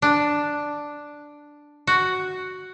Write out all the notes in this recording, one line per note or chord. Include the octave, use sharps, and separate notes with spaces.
D4
F#4